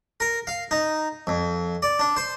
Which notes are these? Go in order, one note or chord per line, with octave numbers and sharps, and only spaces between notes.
A#4
F5
D#4
F2
D5
D4
C5